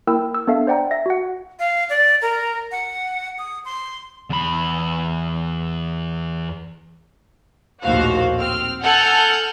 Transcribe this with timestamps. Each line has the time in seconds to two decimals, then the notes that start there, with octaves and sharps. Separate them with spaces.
0.07 A#3 E4 A#4 G5 E6
0.34 E6
0.47 B3 D4 A4 E5 F5
0.67 C5 D5 F#5 G5 A#5
0.91 E5 A#6
1.06 F#4 F#5
1.59 F5
1.89 D5
2.22 A#4
2.72 F#5
3.39 D#6
3.65 C6
4.30 E2 B5
7.82 A#1 D#2 A2 F#4 C5 F5
8.38 C4 F6
8.81 A4 F#5 G#5 F6 G6